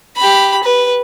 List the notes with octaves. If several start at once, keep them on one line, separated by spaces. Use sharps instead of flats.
G4 B5
B4